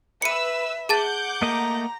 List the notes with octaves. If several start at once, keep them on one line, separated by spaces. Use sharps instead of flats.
B4 E5 E6 C#7 D#7
G#4 F#5 A5 D6 G6 A6
A3 A#3 D#5 A#5